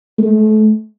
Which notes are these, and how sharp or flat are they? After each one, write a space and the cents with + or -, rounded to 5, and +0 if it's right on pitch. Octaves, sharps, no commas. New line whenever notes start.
A3 -35